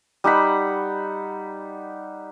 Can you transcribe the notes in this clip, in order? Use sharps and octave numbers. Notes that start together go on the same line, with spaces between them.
G3 D#4 F#5 B5